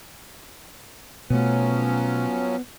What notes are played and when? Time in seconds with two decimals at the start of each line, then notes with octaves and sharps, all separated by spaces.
1.30 B2 F3 F#3 A3 B3 C#4